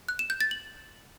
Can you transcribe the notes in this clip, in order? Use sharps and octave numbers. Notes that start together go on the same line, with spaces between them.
F#6
E7
G6
A6
F#7